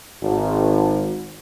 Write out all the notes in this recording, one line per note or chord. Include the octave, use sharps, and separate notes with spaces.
G#1